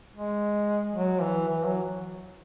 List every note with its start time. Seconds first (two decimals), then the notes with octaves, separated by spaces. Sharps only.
0.17 G#3
0.95 F#3
1.22 E3
1.48 E3
1.66 F#3